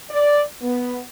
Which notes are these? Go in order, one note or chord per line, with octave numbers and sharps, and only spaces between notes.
D5
B3